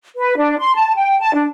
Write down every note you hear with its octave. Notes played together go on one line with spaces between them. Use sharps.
B4
D4
C6
A5
G5
A5
D4